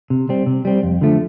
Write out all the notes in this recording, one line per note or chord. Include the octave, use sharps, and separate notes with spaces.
C3
G3 C4
C3
G3 C4
F2
D3 F3 A3